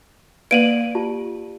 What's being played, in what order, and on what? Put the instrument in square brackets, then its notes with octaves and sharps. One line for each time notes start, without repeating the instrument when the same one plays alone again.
[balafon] A#3 B4 [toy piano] D5 F5 [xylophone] D7 D#7 F#7
[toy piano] F4 G4 A5